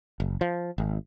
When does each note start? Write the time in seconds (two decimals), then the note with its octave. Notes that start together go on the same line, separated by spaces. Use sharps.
0.20 F#1
0.41 F3
0.78 G#1